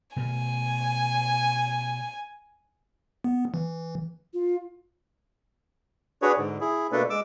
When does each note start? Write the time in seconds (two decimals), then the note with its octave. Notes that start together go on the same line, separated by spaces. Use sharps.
0.16 B2 A3 G#5
3.24 B3
3.54 E3
4.34 F4
6.22 D4 F#4 G#4 B4 C#5
6.38 G#2 D3
6.61 E4 G#4
6.92 B2 A3 A#3 D4 A4 B4
7.10 G#3 D6 E6